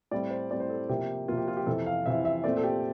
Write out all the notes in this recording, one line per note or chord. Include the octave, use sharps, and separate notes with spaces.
A2 G3 C4 D5
C5
A2 G3 C4 D5
C5
A4
C3 F3 A#3 G4
C3 F3 A#3 F4
G4
F4
G4
F2 C3 E3 A4
F5
F2 C3 E3 E5
E5
A#2 A3 C4 D5
A4
G4